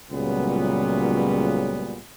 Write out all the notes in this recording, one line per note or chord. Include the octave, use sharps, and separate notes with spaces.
C#2 A#2 C#3 F#3 G3 B3